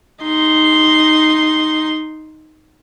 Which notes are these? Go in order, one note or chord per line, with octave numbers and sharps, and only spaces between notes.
D#4 C6